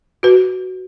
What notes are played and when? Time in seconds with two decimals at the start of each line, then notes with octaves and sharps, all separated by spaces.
0.23 F#4 B4